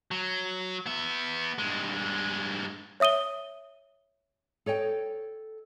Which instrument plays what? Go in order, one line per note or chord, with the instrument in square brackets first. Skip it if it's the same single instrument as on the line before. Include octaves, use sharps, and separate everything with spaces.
[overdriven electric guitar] F#3
B3 E5
G2 G#3
[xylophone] C#5 E5 D#6 D#7 G7
[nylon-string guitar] A4 C#5 D#5 G5